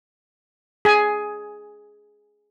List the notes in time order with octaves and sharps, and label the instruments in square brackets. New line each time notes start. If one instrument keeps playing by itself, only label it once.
[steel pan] G#4 G#5